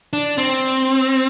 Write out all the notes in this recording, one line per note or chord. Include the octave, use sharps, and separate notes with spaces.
D4
C4